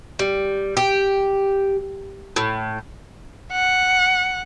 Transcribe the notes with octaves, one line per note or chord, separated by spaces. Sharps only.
G3
G4
A2
F#5